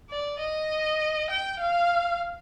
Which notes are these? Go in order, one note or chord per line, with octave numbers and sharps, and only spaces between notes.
D5
D#5
G5
F5